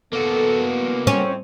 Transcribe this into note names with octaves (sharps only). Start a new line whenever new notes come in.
A#3 B3 F#4 A4
F2 A2 C4 C#4